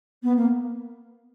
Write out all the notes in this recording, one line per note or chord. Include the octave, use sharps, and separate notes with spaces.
B3
A#3